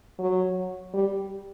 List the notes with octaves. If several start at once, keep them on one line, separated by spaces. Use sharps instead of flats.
F#3
G3